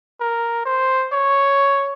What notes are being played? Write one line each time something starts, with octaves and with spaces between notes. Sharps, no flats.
A#4
C5
C#5